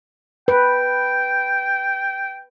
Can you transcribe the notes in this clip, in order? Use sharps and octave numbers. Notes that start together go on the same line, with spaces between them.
B4 G5